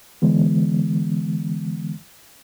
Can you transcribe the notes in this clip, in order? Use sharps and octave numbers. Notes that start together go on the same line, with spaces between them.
D3 E3 G#3 B3